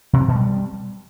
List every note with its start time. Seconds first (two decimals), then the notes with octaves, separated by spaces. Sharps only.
0.13 C3
0.21 C4
0.28 B2
0.35 G3